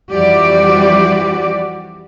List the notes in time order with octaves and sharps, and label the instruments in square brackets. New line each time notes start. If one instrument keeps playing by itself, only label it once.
[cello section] F2 E3 G3 F#4 G4 D5